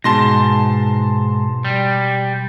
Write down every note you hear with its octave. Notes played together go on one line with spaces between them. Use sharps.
G#2 B2 A5 C6 A#6
G3